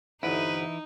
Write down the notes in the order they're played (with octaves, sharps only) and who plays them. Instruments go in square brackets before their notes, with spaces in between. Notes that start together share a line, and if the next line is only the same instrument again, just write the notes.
[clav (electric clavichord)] G1 D2 [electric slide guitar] E3 E4 [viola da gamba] D#4 [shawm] B4